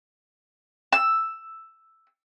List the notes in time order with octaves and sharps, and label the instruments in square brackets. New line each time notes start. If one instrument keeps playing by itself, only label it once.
[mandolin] E6